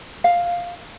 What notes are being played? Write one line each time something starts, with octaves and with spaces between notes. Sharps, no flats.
F5